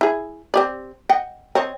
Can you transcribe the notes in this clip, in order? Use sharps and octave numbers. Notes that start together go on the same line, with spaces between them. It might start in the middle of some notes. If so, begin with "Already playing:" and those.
E4 G#4
C4 G4 D5
D#5 F#5 G5
C4 C#5 D#5